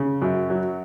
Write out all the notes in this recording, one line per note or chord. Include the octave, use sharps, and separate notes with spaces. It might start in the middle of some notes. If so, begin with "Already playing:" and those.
Already playing: C#3
F#2
F#3